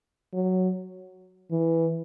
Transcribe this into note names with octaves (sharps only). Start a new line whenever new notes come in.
F#3
E3